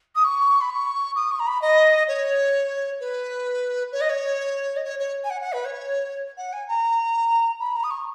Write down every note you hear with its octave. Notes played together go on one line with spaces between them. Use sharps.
D#6
C#6
B5
C#6
D#6
C#6
A#5
B5
D#5
C#5
B4
C#5
D#5
C#5
D#5
C#5
C#5
G#5
F#5
F#5
B4
C#5
F#5
G#5
A#5
B5
A#5
D#6
C#6